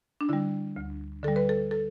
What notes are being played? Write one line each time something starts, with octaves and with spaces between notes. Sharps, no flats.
D4
D3 G3 E4
D2
D3 G3 A4
B4
A4
A4